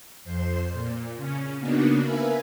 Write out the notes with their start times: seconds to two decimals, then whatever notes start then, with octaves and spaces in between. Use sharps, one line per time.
0.24 F2 C5 C6
0.72 A#2
1.16 C#3 C#4
1.56 C#3 A#3 B3 D4 D#4 F#4
2.00 A#4 B4 E5 F5 G#5